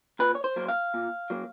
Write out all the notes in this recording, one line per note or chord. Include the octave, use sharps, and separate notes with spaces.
A#2 B4
C#5
C5
F#3 A#3
F5
A#2
F#3 A#3